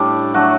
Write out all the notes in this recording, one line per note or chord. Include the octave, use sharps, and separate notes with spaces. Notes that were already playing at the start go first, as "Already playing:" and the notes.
Already playing: A2 G3 D4 G4
F#3 A3 D4 F#4